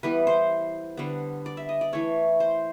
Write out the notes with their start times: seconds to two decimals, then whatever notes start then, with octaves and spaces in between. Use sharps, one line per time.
0.03 E3 G3 B3 B4
0.27 C5
0.97 D3 G3 B3
1.46 D5
1.57 E5
1.69 D#5
1.81 D5
1.93 E3 A3 C#5
2.40 C5